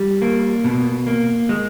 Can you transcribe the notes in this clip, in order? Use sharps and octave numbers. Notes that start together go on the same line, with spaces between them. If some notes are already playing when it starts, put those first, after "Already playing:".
Already playing: G3
A#3
B2
A#3
G#3